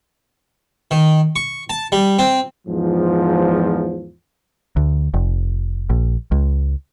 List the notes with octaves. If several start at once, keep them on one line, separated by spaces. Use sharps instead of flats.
D#3
C#6
A5
G3
C4
E2 G#2 F3
D2
F1
A#1
C#2